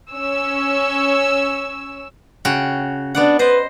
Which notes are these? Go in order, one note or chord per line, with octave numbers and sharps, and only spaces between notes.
C#4 C#5 E6
C#3 F#4 G5
B3 D4 D5 F#5
B4 C5 D#5